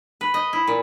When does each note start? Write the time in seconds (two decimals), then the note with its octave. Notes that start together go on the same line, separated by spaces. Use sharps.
0.21 B4
0.34 D#5
0.53 E4
0.68 A#2